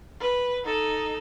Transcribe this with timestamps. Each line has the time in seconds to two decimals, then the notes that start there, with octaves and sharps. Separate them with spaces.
0.20 B4
0.64 D#4 A4